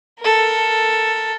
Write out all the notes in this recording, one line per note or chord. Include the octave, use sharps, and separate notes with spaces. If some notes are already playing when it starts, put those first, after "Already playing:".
A4 A#4